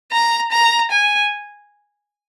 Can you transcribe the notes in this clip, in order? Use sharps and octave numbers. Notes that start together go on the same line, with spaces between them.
A#5
A#5
G#5